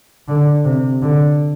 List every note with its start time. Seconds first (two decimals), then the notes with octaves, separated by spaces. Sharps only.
0.28 D3
0.65 C3
1.02 D3